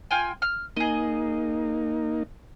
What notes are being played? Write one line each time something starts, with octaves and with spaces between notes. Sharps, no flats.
F4 G5 G#5
F6
A#3 D#4 G#4 D#5